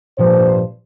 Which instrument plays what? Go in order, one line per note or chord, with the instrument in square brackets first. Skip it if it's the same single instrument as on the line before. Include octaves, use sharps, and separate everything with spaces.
[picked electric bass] G#1 A#2 F3 [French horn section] G2 C5